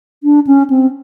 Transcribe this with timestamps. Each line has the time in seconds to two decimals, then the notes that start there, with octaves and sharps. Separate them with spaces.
0.24 D4
0.47 C#4
0.70 C4